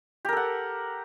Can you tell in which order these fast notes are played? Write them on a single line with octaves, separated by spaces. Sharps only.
G4 A#4 A4 F#5